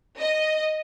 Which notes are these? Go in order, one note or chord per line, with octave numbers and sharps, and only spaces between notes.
D#5